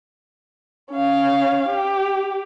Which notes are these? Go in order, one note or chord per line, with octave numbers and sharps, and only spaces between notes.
C#4 F5
G4